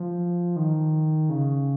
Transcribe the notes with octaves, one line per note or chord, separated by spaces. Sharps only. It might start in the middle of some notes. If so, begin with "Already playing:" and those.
Already playing: F3
D#3
C#3